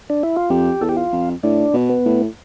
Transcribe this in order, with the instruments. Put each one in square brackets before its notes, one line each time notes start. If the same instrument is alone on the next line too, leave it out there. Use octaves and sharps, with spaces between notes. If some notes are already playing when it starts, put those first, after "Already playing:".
[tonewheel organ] D4
E4
F4
[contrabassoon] F2 [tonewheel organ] G4
[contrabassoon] E2 [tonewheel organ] A4
[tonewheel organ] G4
F4
[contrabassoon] F2
[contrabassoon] A2 [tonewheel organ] D4
[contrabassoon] B2
[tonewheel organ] B3
[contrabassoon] A2